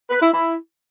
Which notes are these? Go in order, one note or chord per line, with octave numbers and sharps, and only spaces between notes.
B4
E4
E4